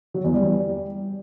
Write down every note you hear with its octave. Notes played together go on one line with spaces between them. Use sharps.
F#3
E2
G3